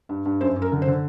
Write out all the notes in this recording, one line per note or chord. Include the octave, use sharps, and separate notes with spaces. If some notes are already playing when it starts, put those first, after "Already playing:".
G2
G2
F#2 C5
F#2
A#4
D3
C5
D3